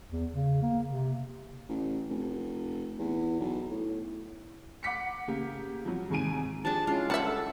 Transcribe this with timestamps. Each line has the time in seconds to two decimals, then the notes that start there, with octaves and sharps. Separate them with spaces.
0.11 E2
0.34 C#3
0.62 A#3
0.89 C3
1.69 A1
2.09 F1
2.99 E2
3.40 B1
3.71 A2
4.83 F#5 D6 B6 C#7
5.28 C#3 A#3 G4
5.85 F3 F#3
6.10 D#2 G#2 C3 G#5 D7 D#7
6.65 F3 D4 G4 G#4 A5
6.87 G#3 C#4 D4 E4 F4
7.10 G3 A#4 E5 F#5 A5
7.26 A4